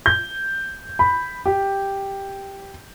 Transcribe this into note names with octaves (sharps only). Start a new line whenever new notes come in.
G6
B5
G4